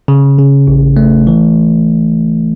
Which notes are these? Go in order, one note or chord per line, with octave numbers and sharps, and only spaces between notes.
C#3
C#3
A1
A3
E3